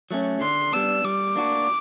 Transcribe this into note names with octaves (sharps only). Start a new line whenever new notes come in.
F#3 A3 C#4
D3 C6
G3 B3 D4 E6
G3 D6
A#3 D4 F#4